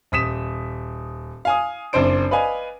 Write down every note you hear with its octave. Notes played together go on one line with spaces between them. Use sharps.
D#1 D#6 B6 E7
F5 G#5 D#6
F#1 C4 D4 C5 D7
B4 D5 D#5 F5 G#5